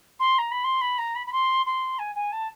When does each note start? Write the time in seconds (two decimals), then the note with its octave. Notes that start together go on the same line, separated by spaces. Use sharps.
0.20 C6
0.38 A#5
0.51 B5
0.64 C6
0.81 B5
0.98 A#5
1.15 B5
1.27 B5
1.32 C6
1.66 C6
1.99 G#5
2.15 G#5
2.32 A5